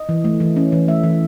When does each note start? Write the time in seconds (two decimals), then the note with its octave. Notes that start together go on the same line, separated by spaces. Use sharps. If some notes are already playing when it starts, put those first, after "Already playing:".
Already playing: D#5
0.09 E3
0.24 A3
0.40 E3
0.56 C#4
0.72 E3
0.88 A3 E5
1.03 E3